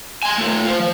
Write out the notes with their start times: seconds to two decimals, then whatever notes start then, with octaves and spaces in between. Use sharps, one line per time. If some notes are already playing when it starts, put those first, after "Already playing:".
0.23 G#5 C6
0.38 A3 F4
0.65 F4 C5
0.80 F3